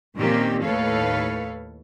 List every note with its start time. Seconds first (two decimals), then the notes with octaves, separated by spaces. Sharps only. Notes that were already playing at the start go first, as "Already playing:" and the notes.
0.16 A#2 D#3 A#3 C4 C#4 G4
0.63 D#2 A2 A4 B4 C#5 F5